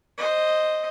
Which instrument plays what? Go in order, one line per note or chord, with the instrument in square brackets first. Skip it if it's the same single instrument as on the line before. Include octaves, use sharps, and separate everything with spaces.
[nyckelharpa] C5 D#5